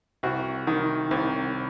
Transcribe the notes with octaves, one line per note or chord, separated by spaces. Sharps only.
C2 F#4
D#3
C2